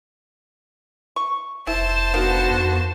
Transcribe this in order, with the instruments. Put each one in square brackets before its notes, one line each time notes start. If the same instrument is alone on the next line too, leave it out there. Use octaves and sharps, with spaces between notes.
[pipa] C#6
[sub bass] F1 [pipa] E4 [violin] C5 A5
[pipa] D3 D#3 F5 [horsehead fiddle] B3 F#4
[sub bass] F2